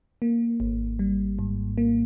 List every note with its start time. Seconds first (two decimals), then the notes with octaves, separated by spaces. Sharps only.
0.22 A#3
0.60 G#1
0.99 G3
1.39 G#2
1.78 A#3